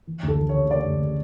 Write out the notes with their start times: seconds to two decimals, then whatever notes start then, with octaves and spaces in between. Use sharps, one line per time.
0.07 E3
0.23 D2
0.28 A4
0.39 E3
0.49 C#3 C#5
0.70 C#3 D5
0.86 D2
1.02 C#3